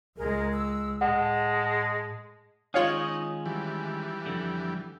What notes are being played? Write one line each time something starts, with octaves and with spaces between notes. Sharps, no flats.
C#2 G#3 G#4 A#4
E6
A2 G#3 F#5 A5
D#3 G#3 C#4 D#4 F4 C#5 F5
E3 G3
F2 D3